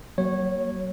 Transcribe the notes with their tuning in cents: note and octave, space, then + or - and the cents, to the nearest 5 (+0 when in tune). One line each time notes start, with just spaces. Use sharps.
F#3 +25 A#3 +0 C#5 -15